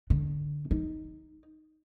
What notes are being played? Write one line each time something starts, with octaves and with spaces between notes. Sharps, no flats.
D3
D#4